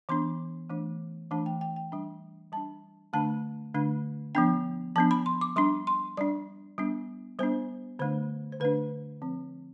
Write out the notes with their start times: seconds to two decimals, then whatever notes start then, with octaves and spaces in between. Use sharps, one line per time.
0.09 E3 B3 D4 C6
0.70 E3 A3 D4
1.31 E3 A3 D4 A5
1.46 G5
1.61 G5
1.76 G5
1.92 G3 D4
2.52 G3 D4 A5
3.13 D3 A3 D4 A5
3.74 D3 A3 D4
4.35 F3 B3 D4 G5
4.96 F3 B3 D4 A5
5.11 B5
5.26 C6
5.41 D6
5.56 G3 D4 C6
5.87 C6
6.17 G3 D4 D5
6.78 G3 B3 D4
7.39 G3 B3 D4 C5
7.99 D3 A3 D4 C5
8.52 C5
8.60 D3 A3 D4 B4
9.22 F3 C4